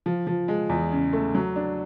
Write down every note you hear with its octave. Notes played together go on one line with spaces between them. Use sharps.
F3
F3
G#3
E2
C#3
A3
F#3
D4